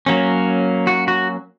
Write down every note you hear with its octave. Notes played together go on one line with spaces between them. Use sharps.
F#3 A#3 C#4
F#4
F#4